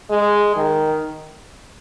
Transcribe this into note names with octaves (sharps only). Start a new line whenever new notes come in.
G#3
D#3